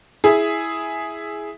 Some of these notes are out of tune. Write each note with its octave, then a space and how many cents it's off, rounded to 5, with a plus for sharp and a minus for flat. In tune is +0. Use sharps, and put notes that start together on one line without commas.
E4 +0 G#4 +5